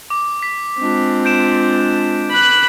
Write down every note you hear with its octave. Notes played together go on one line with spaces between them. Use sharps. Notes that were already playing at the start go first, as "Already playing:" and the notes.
D6
B6
G#3 C4 D4 F4
G6 D7 E7
B5 F#6